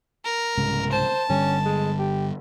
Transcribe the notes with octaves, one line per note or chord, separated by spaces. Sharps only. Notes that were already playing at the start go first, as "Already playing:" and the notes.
A#4
C2 G#2 C#3
C5 A5
G1 D3 G3 C#4
G#3
G4